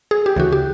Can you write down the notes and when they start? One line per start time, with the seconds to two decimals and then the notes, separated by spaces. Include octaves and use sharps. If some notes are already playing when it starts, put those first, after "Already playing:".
0.11 G#4
0.26 G4
0.36 D2 C#3 E3 F#4
0.52 G4